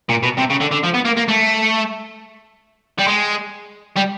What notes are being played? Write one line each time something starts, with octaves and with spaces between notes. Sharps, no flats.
A#2
B2
C3
C#3
D3
D3
F3
B3
A#3
A#3
A3
G3
G#3
G3